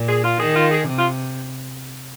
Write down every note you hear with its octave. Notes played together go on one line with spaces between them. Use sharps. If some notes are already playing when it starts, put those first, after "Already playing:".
Already playing: A#2
G#4
F4
D#3 G#4
F4
G#4
C3
F4